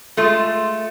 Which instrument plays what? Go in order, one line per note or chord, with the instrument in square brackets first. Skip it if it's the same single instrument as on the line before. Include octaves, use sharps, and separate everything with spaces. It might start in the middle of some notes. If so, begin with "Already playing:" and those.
[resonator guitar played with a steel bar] G#3 A3 F4 G#4